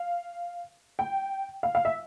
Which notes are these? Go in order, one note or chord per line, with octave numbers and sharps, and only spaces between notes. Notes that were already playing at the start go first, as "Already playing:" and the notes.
Already playing: F5
G5
F5
F5
E5